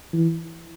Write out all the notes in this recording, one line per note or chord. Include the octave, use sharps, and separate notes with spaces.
E3